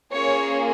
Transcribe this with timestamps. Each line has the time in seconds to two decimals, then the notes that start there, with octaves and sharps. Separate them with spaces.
0.13 A#3 C#4 F4 G#4 C#5